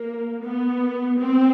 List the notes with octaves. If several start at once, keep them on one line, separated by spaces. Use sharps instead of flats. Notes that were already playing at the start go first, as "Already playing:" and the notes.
Already playing: A#3
B3
C4